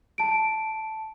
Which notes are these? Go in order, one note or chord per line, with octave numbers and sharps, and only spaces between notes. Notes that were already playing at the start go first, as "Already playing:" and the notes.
A5 D7